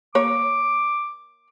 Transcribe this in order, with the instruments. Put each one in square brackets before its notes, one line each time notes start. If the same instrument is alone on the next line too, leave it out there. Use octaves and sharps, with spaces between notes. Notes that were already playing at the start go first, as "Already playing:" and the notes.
[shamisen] A#3 C#5 [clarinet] D6